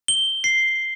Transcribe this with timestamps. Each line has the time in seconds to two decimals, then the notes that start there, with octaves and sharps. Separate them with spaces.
0.08 G7
0.44 C7